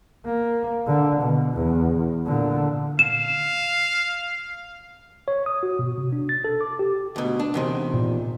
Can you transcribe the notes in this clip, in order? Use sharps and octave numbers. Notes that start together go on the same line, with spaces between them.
A#3
D3
B2
E2
A#2 D3
F5 E7
C#5
D#6
F#4
B2
C3
D4
A6
A4
D6
G4
D2 B2
D4
E2 C3 D#3
A#2